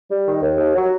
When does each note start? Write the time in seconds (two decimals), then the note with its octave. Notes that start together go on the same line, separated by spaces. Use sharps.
0.10 G3
0.26 D#3
0.42 D#2
0.58 D#2
0.75 F#3